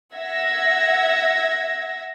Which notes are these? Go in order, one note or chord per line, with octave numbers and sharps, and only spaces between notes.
E5 F#5 E6 G#6 A#6